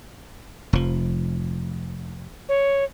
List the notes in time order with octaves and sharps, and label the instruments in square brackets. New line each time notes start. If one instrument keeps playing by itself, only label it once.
[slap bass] F1 F3
[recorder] C#5